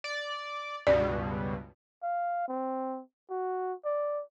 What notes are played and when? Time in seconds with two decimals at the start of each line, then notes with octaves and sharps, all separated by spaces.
0.04 D5
0.87 C#2 G2 B2 D5
2.03 F5
2.49 C4
3.30 F#4
3.85 D5